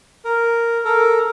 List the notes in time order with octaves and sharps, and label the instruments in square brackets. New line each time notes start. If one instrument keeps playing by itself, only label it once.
[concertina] A#4
A4 A#4